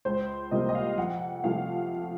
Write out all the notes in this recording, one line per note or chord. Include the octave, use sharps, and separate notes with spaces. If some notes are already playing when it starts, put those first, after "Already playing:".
C#2 C5
C3 F3 A#3 D#5
D#5
F5
F2 F#5
C3 F3 A3 F5